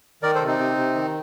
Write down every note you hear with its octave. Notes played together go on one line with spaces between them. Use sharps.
D#3 A#4 D5
A4 C5
C3
C4 D#4
C3
C3
D#3